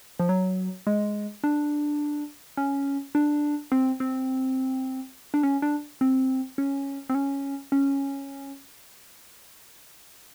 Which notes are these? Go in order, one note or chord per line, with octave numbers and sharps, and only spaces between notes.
F3
F#3
G#3
D4
C#4
D4
C4
C4
D4
C#4
D4
C4
C#4
C4
C#4
C#4